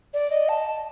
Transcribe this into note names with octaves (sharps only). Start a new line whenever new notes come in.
D5
D#5
A5